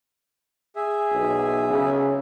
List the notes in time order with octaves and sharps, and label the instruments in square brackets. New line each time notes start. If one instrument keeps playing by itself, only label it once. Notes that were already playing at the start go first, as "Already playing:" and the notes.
[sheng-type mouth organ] G#4 E5
[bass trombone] B1
C#3